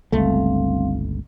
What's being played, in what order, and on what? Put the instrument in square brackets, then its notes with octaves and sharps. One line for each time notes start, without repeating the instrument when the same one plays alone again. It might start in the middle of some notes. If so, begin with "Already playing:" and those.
[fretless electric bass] G1 C#2 A3 [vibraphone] G3 C4 F5